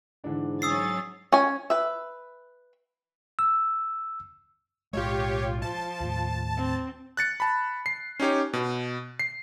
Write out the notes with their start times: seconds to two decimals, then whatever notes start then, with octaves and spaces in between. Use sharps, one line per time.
0.24 G#2 D3 E3 D4
0.62 F#3 C#4 D#6 E6 A6 C7
1.32 C#4 G#5
1.70 B4 E5
3.39 E6
4.93 B1 A2 G#3 F4 G4 C#5
5.62 F3 A5
6.00 D#2 A2
6.57 C4
7.17 F#6 A6 C#7
7.40 A5 B5
7.86 C7
8.20 C#4 D#4 G4 C#5
8.53 B2
9.19 C7